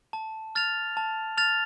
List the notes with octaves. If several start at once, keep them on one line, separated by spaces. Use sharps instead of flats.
A5
F6 A6 F7
A5
F6 A6 F7